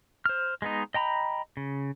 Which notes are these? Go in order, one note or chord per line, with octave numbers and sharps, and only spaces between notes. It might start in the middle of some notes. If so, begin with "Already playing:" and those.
C5 F6
G#3 B3 D#4
D#5 G5 A#5 B5
C#3